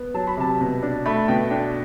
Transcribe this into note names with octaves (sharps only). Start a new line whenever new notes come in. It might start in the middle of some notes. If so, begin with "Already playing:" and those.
Already playing: B3
F#3 A5
B5
C3 A5
B2
D4
A3 B5
B2 G5
D4 G5